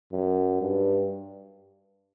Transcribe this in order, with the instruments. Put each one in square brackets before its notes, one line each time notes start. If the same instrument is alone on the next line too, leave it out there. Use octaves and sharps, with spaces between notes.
[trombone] F#2
G2